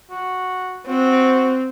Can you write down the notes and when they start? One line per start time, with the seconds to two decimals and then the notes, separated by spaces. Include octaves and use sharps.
0.10 F#4
0.87 C4 F#4